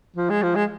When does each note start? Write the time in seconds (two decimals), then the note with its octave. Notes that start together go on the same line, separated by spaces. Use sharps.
0.16 F3
0.30 G#3
0.43 F3
0.55 G#3